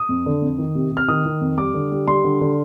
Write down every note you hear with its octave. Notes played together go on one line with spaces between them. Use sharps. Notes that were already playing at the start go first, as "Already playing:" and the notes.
Already playing: D#6
F2
D3
F2
D#3
C3
C3
F6
D#3 D#6
D#3
F2
G3 D6
D3
G3
G3 C6
D3
D3